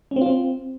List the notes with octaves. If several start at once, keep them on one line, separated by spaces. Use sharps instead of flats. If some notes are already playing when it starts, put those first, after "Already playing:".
C#4
C4
F4
C4